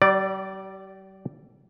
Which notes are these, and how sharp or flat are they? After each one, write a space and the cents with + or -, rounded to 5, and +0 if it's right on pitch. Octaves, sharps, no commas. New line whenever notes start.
G3 -40 D5 +0